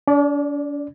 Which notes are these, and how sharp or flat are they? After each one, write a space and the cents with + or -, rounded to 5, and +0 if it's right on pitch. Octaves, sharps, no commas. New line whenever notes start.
D4 -45 D5 +0